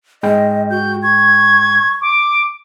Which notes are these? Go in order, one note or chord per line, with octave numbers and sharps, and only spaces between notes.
G#2 G#3 D#5 G5
F#4 G6
C#6 G#6
D6